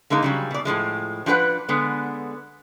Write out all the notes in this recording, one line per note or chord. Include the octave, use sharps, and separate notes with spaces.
D3 G#3 A#3 D#4
C#3 F#3 G3
B2 D5
A2 C3 F3 G#3
F3 D4 G4 B4 F#5
D3 G#3 B3